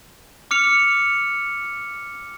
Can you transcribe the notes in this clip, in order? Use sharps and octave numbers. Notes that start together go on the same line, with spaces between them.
D6 F6 C#7 F7